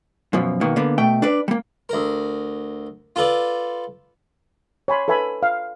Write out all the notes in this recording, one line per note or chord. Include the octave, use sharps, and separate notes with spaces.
F#2 B2 F3
B2 D#3 A#3 B3
D3 A#3 B3
B2 A3 G5
D4 B4 D5
G3 A#3
D2 A#4
F4 A4 B4 D5
C#5 G#5 B5 C6
A4 B4 E5 G#5 B5
F5